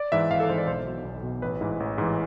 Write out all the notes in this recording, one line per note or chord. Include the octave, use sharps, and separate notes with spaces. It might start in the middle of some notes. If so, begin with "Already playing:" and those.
Already playing: D5
G#2 E3 E5
G#1 F5
A4
G#2 E3 C5
D5
B1 C5
B2
B1
B2
A1 B4
G#2 E3
A1
G#2 E3